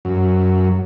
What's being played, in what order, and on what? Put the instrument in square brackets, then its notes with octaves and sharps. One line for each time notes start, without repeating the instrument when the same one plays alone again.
[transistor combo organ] F#2